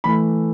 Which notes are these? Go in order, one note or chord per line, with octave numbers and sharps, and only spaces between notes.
E3 A3 B5